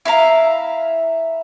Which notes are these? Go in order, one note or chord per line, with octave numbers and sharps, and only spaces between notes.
E4 E5 F5 A#5